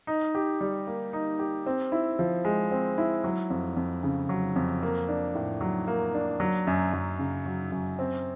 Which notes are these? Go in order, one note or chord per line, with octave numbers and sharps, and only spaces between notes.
D#4
G4
G3
A#3
D#4
G4
C4
E4
F3
G#3
C4
E4
F#3
F2
F2
C#3
F#3
F2
A#3
D4
A2
F#3
A#3
D4
F#3
F#2
F#2
C#3
F#3
F#2
C4